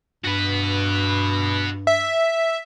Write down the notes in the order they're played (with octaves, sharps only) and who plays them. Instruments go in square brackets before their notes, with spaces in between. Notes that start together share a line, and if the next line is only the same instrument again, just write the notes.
[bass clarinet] G2 [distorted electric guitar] F#4 B4
[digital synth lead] E5